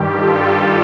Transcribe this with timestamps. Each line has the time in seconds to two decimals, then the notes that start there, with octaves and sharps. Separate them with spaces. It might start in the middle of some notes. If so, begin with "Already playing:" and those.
Already playing: G2 D#3 G3 G4
0.20 F4 A4